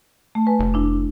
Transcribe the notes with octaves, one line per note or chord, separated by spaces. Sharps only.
A3
B4 G#5
F1
D4 E4